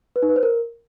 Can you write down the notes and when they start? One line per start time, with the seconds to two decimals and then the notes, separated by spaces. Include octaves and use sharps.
0.16 B4
0.22 D#4
0.29 B4
0.36 C5
0.43 A#4